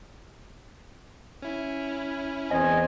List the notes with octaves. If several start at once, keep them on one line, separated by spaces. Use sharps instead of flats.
C#4 E4
E2 C4 D#5 G#5